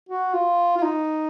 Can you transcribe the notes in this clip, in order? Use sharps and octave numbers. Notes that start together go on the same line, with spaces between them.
F#4
F4
F4
D#4